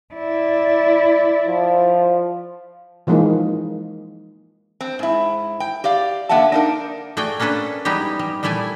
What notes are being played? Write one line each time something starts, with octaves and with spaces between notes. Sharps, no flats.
E4 D5
F3
E3 F3 G#3 A#3 D#4
C4
G#2 E4
G5
G4 D5 F5
D3 A#3 D5 E5 F#5 A5
D4 D#4 A#4
A3 F#4 G#4 D5 G5
A#3 C#4 D4 A4 B4
G3 G#3 B3 D#4 E4 G4
G3
A#2 G3 A3 E4 D5 G#5